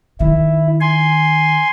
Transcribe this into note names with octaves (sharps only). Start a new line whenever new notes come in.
D#3 E4
G#5 C6